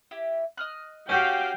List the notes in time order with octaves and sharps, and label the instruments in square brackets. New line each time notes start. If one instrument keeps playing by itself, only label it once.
[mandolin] E4 G4
D#5 F6 F#6
[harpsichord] C#4 F#4 G4 [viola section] F5 G5